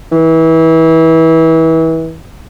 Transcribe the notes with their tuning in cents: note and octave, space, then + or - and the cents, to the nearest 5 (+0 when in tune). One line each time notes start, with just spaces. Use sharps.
E3 -30